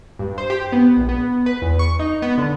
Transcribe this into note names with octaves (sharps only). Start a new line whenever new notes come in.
G2
C5
G4
B3
A#1
B3
B4
E2
C#6
D#4
B3
D3